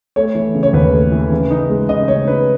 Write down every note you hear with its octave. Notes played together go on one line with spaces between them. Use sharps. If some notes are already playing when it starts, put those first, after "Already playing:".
A3 C#5
E3
C#3
C#5
D#2 B4
A3
E3
C#3
D#4
G#3
C#3 D#5
C#3 C#5
D#4 B4